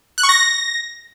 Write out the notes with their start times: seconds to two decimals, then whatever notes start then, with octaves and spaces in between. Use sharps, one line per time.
0.18 F#6
0.23 C#6
0.29 A#6